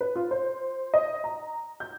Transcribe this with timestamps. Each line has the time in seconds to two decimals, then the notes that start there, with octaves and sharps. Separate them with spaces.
0.01 B4
0.16 F4
0.31 C5
0.94 D#5
1.24 A#5
1.80 G6